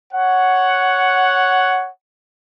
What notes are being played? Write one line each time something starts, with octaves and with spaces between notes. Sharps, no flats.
C#5 F#5